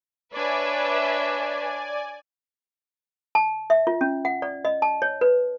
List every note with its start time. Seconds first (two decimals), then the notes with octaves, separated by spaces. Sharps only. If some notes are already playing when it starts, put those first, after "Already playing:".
0.34 D4 B4 C#5 D5 E5 G#5
3.35 A5
3.70 E5
3.87 F4
4.01 C#4
4.25 F#5
4.42 D5
4.65 D#5
4.82 A5
5.02 C#5
5.21 B4